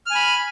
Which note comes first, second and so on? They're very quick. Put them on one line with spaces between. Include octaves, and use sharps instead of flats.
F6 G#5 B5